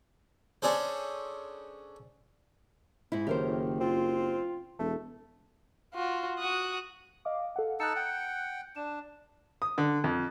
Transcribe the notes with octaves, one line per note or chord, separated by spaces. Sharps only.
C#4 D4 G#4 A4 C5
G#2 E4
F#1 A2 D#3 G4 A#4 C5
C4 F4
E1 A3
F4 F#4
F#4 D#6 F#6
D#5 F5 D6
A4 F5 F#5
D#4 A5 E6 F#6 C#7
F#5 G5
D4 E7
D#6
D3
F2